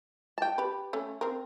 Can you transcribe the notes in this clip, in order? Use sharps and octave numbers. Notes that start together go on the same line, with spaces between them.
G5 A5
G4 B4
A3 C#4
C4 A#4